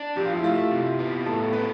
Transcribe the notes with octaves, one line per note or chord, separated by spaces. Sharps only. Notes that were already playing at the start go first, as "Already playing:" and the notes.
Already playing: D4
F3 G4
F4
E4
A3 F4
C3
B3
A2 A4
B3 B4